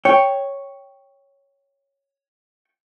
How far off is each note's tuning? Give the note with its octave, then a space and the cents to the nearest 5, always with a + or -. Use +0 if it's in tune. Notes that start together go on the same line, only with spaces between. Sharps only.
C#5 +0 G5 +0